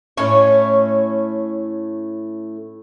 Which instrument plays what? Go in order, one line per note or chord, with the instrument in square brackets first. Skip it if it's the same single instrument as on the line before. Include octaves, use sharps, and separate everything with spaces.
[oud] A2 C#4 C#5